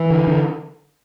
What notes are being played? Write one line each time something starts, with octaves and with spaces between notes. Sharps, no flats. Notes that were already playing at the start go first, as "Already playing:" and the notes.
Already playing: E3
D3
D3